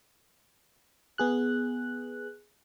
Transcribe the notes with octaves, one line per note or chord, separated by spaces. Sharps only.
B3 G#4 F#6